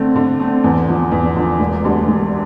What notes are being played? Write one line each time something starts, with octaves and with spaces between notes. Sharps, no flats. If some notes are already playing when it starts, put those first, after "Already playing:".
Already playing: D3 A3 C4
D3
A3 C4
E2
D3 F3
E2
D3 F3
E1
D2 D3 G3
E1